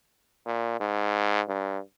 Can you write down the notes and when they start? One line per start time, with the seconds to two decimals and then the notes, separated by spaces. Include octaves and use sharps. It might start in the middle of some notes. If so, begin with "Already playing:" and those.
0.46 A#2
0.80 G#2
1.48 G2